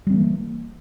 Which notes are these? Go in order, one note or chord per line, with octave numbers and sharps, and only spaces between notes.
E3 G3 A#3 C4